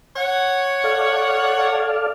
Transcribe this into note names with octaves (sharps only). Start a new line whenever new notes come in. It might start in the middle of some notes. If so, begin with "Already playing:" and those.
C#5 F#5
A4 D5 F5